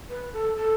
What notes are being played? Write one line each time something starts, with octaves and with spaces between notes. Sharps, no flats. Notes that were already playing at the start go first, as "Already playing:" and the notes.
B4
A4
A4